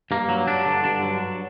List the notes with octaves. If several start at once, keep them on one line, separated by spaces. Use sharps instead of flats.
G2 A#3
F#3
G2 D4
D3
G2 D4
F#3